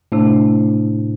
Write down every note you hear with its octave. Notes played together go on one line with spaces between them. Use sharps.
A2 C3 A3 D4